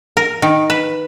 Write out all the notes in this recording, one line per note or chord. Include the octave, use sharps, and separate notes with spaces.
A#4
D#3
B4